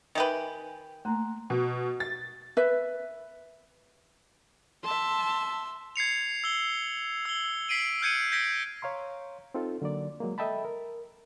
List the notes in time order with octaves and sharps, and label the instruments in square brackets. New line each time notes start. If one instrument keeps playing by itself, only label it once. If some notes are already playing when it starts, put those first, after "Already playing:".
[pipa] D#3 G4 B4 [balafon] D#5 E5 G5 [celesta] G#5 F#7
[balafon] A3 A#3 [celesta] A#5 C6 F#6
[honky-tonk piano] B2
A6
[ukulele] B4 E5
[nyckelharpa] E5 C6 [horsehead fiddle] A5
[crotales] G#6 C7 C#7 F7
E6 G7
E6 G7
B6 C7 D7 D#7 F#7
F6 G6 G#6 C#7 D#7
G6 G#6 A#6 B6 D7 D#7
[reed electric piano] C#5 F5 A#5 C6
C4 D#4 F4 A4
D3 F#3 A#3 D5
F#3 G#3 A#3
A4 D#5 E5 G5 A5 B5
A#4